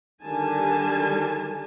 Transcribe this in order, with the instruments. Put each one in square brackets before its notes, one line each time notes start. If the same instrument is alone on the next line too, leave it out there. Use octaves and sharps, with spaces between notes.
[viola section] D3 D#3 G3 G#5 A5